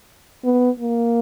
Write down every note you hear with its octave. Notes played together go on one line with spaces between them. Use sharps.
B3
A#3